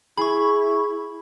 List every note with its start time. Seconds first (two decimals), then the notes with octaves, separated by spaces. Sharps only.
0.17 E4 G#4 B5 C#6